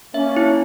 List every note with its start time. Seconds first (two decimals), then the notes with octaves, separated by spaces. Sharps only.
0.14 A#3 C#4 E5
0.37 E4